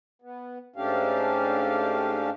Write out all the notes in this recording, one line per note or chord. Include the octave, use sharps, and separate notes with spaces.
B3
G#2 A3 C#4 D4 G4 F5